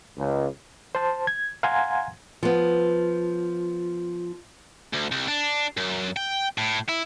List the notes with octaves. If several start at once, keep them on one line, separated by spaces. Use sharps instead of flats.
C#2
C5 A5
G#6
F5 F#5 G#5 A#5 C6 G#6
F3 B3
D2
C2
D4
F#2
G5
A2
E4